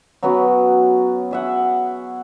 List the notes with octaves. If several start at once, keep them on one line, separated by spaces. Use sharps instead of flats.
F#3 B3 C#4 F#4
G#4 E5 F#5